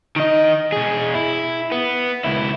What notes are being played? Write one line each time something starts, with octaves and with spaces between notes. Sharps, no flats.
D#3 D#5
B2 G#4
E4
B3
C#2 E4